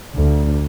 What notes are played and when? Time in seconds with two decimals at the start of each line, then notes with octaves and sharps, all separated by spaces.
0.16 D2